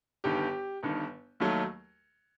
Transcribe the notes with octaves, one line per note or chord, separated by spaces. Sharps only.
G1 G2 D#3 G4
G1 G2 D#3
D#2 D#3 F#3 A3